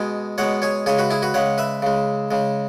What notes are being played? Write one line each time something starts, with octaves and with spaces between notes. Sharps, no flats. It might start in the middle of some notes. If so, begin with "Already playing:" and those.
Already playing: B2 G#3 G#5
B2 G#3 C#5 F#5
G#4 C#5
C#3 G#3 G#4 C#5
F#4 B4
E4 G#4
F#4 B4
C#3 G#3 C#5 F#5
B4 E5
C#3 G#3
C#3 G#3